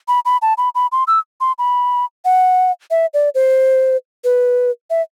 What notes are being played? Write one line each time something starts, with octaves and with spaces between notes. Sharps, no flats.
B5
B5
A5
B5
B5
C6
E6
C6
B5
F#5
E5
D5
C5
B4
E5